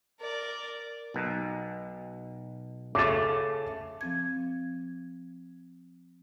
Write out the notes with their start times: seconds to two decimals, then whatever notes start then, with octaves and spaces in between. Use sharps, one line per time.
0.20 A#4 D5
1.14 B1 B2
2.95 C#3 A3 D6 A6
4.01 F3 C4 G#6